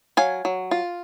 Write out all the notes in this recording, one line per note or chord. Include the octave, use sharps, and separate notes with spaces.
F#3 F5 G#5
F#3
F4